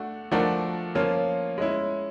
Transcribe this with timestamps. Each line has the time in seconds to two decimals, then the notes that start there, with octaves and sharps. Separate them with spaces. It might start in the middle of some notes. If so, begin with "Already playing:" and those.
Already playing: A3 D4 F#4
0.31 F3 A3 D4 F#4 A#4
0.95 F3 A#3 C#4 F4
1.58 G#3 C#4 E4